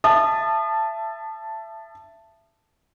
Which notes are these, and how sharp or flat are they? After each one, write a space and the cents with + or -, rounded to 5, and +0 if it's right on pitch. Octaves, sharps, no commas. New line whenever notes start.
E5 +20 A5 +0 D#6 -35